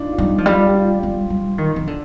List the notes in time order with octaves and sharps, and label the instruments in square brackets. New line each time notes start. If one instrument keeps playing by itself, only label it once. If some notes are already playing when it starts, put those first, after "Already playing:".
Already playing: [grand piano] D4 D#4 F4
F4
[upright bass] G3 [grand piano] D#4
[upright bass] F3
[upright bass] G3 [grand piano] F4
[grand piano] G4
F4
[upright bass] G3
G3
D#3
D#3
D3